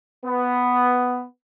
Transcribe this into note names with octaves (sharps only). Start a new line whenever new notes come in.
B3